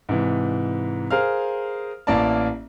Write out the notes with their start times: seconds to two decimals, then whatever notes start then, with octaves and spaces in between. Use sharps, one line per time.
0.09 G#2 C3 E3
1.11 G#4 A#4 C5 F5 F6
2.07 A1 A#3 E4 A#4 D5 A5